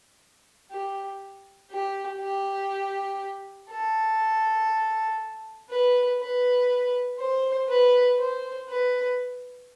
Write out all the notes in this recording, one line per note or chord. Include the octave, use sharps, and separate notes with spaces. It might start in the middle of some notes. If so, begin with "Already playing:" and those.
G4
G4
G4
A4
B4
B4
C5
B4
C5
B4